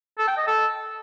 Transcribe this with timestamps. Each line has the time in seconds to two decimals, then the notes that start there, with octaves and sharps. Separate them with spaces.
0.18 A4
0.28 G5
0.37 D#5
0.47 A4